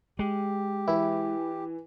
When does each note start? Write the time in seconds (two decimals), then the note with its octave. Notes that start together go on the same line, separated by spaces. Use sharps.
0.19 G#3 G4
0.88 E3 E4